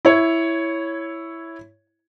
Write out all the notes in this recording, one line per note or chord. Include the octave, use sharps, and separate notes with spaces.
E4 C#5